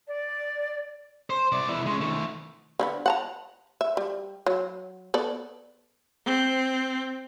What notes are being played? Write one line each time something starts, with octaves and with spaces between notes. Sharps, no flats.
D5
C5
C2 D5
B2 E4
G#3 C#4
D#3 A3
D3 G#3 B3
F#5 A5 A#5
E5
G3
F#3
B3 A4 D5
C4